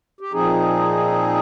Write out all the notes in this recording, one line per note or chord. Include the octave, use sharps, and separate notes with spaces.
G4
A#2 F3 C4 D#4 G#4